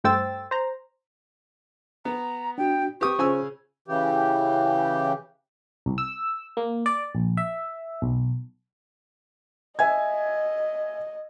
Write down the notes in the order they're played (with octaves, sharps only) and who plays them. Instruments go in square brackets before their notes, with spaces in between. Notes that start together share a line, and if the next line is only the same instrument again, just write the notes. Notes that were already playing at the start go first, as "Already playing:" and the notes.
[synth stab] G2 A3 C5 G5 E6 A6
C5 A#5
[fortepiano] B3 [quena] A#5
[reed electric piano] D4 F#4 [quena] G5
[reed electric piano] C4 B4 [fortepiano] G4 D#6 [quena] C#6
[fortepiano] C#3 G#5 E6 [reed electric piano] C#4 F4 C5
[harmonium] C#3 E3 G4
[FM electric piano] C2
E6
A#3
D5
A#1
E5
B1
[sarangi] D#5 [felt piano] E5 G#5 G#6